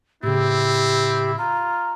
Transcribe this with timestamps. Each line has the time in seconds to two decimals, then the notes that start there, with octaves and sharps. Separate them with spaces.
0.23 A2 C#3 C4 E4 G4
1.38 F4 A#5